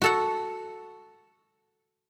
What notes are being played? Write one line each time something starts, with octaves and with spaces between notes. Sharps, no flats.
F#4 A4 F#5